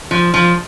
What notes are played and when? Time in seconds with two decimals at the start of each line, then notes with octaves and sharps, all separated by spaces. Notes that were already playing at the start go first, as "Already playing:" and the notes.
0.11 F3
0.34 F3